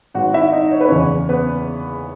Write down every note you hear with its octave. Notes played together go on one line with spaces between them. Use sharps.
G#1 G#2 D#3 F#4 F#5
E4 E5
D#4 D#5
C#5
B4
F#1 E2 C#3 E3 C#4 C#5
B3 B4